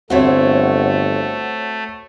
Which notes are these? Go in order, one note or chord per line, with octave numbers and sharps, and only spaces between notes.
G1 A3 C4 F#4 C5 C#5 E5